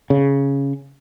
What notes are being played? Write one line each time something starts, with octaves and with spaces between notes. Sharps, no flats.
C#3